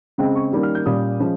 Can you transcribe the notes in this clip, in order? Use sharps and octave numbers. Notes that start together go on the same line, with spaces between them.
C#3 G#3 C4 G5
C#6
D#3 G3 A#3 C#4
F6
G6
A#2 G3 C#4 D#6
F3 G#3 C#4